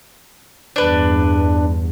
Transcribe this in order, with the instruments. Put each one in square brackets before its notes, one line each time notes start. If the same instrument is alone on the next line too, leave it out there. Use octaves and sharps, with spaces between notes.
[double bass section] E2 G2 [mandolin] D4 B4